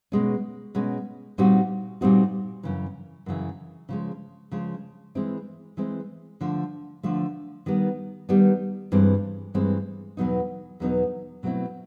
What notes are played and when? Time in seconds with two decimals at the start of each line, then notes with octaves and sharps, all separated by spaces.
0.12 B2 G#3 C#4
0.75 B2 G#3 C#4
1.38 A#2 G3 C4 D#4 F#4
2.01 A#2 G3 C4 D#4 F#4
2.63 F#2 C#3 E3
3.26 F#2 C#3 E3
3.89 C#3 F3 G#3
4.52 C#3 F3 G#3
5.15 E3 G#3 C4 E4
5.77 E3 G#3 C4 E4
6.41 D3 F3 A3
7.03 D3 F3 A3
7.66 D#3 G3 B3
8.29 D#3 G3 B3
8.92 G2 E3 G#3 C4
9.54 G2 E3 G#3 C4
10.17 E2 B2 F#3 B3 D#4
10.80 E2 B2 F#3 B3 D#4
11.43 B2 F#3 A3 C4 E4